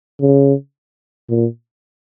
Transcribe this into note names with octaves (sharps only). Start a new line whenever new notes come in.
C#3
A#2